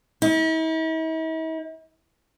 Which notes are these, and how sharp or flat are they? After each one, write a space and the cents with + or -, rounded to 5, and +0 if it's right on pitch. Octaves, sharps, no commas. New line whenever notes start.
E4 -45